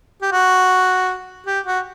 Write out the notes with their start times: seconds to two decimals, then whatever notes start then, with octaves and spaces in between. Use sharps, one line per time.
0.22 G4
0.32 F#4
1.46 G4
1.66 F#4